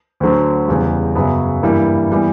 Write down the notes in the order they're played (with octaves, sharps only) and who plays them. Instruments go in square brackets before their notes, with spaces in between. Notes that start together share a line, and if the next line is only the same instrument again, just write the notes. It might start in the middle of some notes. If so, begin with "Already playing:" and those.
[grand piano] D2 D3 F#3
E2 C#3 G3
F#2 C#3 F#3 B3
G2 E3 G3 A#3 E4
E3 G3 B3